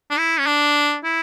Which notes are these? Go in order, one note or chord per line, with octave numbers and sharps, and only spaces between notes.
D4
E4
C#4
D4
E4